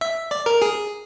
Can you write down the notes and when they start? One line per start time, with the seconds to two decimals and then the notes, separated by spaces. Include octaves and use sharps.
0.01 E5
0.31 D5
0.46 A#4
0.62 G#4